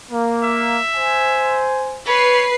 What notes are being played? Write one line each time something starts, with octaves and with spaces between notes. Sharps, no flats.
A#3
E5
C5 G#5
B4 C#5 C7